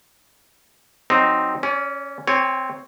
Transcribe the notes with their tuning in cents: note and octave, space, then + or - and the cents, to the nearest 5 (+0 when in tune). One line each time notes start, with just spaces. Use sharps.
F#3 +0 C4 +0 D#4 +0
C#4 +0 D5 -40
C4 +0 C#5 +0 G#5 -45